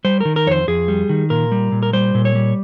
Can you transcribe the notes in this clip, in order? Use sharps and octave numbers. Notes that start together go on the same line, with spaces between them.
G3 C5
D#3 A#4
A#4
F2 C5 C#5
F2 G#4
G3
D#3
A#2 A#4
G3
A#2
A#4
G3 C5
A#2
C#5
G3